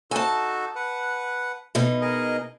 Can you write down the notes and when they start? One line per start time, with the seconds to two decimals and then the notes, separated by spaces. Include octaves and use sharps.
0.11 D#4 F#4 A4 G#5 A5
0.75 B4 F#5
1.75 B2 D#4
2.01 G#4 A#4 D#5